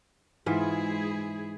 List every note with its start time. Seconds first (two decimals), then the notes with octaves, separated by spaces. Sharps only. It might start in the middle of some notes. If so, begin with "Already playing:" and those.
0.46 G#2 E3 G#3 E4 F4 G#4